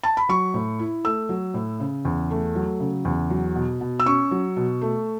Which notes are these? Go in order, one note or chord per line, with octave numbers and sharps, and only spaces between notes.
A5
B5
F#3 C#6
A2
E4
A3 E6
F#3
A2
C#3
E2
A3
F#3
C#3
E2
F#3
B2
B2
E6
C#4 C#6
F#3
B2
A3